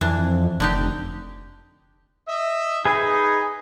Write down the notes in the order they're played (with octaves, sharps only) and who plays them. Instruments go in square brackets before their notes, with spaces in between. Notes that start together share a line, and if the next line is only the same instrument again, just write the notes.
[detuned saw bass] F2 [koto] E3 D4
[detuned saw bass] F1 [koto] D3 D#4 G4
[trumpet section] D#5 E5
[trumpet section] D#4 [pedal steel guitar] G#4 B4 G#5